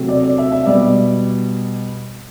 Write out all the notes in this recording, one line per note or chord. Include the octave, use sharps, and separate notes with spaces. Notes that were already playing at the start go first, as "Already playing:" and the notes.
Already playing: C3 F#3 A3
D5
D5
E5
E5
B2 G3 D5